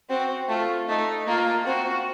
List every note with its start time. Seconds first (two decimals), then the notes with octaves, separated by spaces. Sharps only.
0.10 C4 F#4
0.49 A3 F4
0.88 A3 D#4
1.27 A#3 F4
1.66 C4 F#4